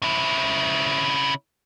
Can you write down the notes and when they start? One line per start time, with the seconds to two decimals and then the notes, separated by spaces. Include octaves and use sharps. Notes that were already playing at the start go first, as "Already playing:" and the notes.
0.02 C#3 E4